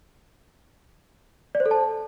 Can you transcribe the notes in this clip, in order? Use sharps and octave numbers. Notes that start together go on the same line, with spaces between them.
D5
C5
A4
A5